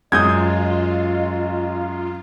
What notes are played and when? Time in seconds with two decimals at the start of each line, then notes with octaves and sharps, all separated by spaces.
0.12 F#2 G#3 F4 D#5 D#6 G6 G#6